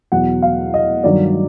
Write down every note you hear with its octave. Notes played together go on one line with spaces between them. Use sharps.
E2 B2 F#3 F#5
F5
D#5
G2 D#3 F#3 D5